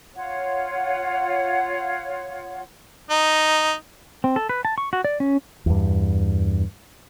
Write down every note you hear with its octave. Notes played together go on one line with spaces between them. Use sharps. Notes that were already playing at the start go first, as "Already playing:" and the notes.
F4 C#5 F#5
D#4
C4
A4
B4
A5
C#6
F#4
D5
C#4
E2 G2